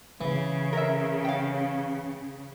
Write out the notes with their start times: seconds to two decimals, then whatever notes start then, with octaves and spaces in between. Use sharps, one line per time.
0.21 C#3 E3
0.73 A#4 E5
1.25 F5 G5